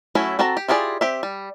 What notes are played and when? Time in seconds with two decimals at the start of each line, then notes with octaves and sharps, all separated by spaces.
0.15 F#3 A3 C#4 E4 A4
0.39 C4 F#4 A4 A5 A#5
0.57 G4
0.68 E4 F4 G4 G#4 D5
1.01 C4 G4 E5
1.23 G3